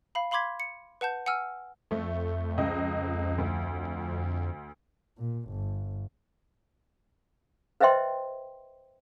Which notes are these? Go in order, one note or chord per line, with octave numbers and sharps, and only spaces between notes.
F5 B5
F5 B5 C6 D6 G#6 B6
C#7
B4 F#5 A5 G6
F#5 G#5 E6 F6
F2 A3
C#2 D#5
D2
A#2
G1
B4 C5 D#5 E5 G5 C6